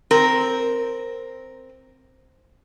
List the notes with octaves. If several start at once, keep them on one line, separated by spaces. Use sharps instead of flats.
C4 A#4